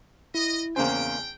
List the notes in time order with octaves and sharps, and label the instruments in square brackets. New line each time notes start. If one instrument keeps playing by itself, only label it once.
[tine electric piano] E4 [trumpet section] D#5
[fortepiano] E2 C#3 C4 [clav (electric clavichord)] A#3 C5 [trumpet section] G5 [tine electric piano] G#5